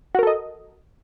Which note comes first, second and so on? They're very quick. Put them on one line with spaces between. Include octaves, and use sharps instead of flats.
F#4 A#4 A4 D#5